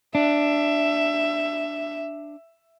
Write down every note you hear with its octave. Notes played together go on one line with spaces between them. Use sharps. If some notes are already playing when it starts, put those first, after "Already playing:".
D4 E5